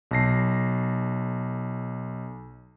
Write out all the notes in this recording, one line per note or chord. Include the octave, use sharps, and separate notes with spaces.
B1 A5 A#6 C7